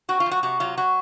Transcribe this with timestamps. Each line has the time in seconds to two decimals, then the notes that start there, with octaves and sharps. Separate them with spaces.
0.09 C4 F#4
0.20 F4
0.26 F3
0.31 F#4
0.43 C3 F#4
0.60 F#3 F4
0.77 F#3 F#4